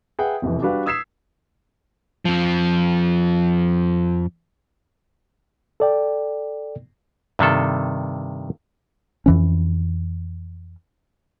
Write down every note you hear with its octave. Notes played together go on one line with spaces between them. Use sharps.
G#4 B4 E5 F#5 G5
E1 F2 C3 E3
G3 D4 F#4 G4 B4 F5
D#6 E6 G#6 B6 C7 E7
F2 F3
A4 D5 G5
G2 C3 D#3 A4
F2 E3 C#4